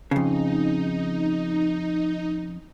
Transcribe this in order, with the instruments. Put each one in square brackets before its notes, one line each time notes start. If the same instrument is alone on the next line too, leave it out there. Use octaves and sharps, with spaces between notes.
[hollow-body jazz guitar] F2 C#3 [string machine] D#4